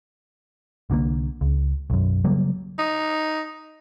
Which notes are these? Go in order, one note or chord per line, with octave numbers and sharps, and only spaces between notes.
C2 D3 F#3 A#3
C#2
B1 F#2
C#3 F#3 G3 A#3
D#4